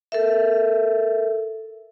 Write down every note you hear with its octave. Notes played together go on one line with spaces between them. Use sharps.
A4 A#4 E5